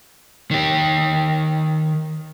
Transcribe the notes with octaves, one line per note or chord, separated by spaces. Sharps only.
D#3 G4